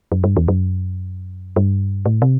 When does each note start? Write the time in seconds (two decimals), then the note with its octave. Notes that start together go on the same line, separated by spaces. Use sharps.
0.12 F#2
0.24 G2
0.37 E2
0.48 F#2
1.56 G2
2.06 A2
2.22 C3